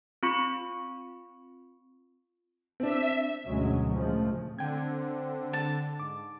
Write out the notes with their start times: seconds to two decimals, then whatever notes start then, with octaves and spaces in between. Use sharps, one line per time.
0.23 C4 F4 B5 C#6 C#7
2.80 C4 D4 E5
3.47 D2 G#2 B2 F#3 G#3 C#4
3.93 A#2 C#3 F3 G#3 A3
4.59 D3 C4 G5 G#6
5.53 A5
6.00 G#2 D6